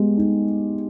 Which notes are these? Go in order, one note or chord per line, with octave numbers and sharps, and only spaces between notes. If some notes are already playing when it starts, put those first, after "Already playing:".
Already playing: G#3 B3 G4
D#4